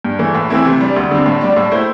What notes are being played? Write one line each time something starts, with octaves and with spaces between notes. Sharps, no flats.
G2
E3 A3
A2
E3 A3 C4 E4
C3
G3 D4
D2
D3 G3 C4
A2
G3 D4
A2
A3 E4 C5